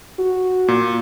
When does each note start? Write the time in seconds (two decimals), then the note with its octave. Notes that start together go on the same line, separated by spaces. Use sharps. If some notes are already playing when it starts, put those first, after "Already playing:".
0.19 F#4
0.68 A#2